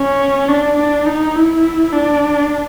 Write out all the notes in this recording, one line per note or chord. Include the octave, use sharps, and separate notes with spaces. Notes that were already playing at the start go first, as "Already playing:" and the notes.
Already playing: C#4
D4
D4
D#4
E4
D4